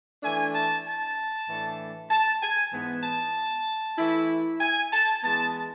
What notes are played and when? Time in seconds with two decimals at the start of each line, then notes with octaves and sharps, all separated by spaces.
0.23 E3 A3 D4 G#5
0.54 A5
0.85 A5
1.48 A2 E3 A3 D4
2.10 A5
2.42 G#5
2.73 G#2 E3 B3
3.04 A5
3.98 E3 A3 E4
4.60 G#5
4.91 A5
5.23 E3 G#3 B3 A5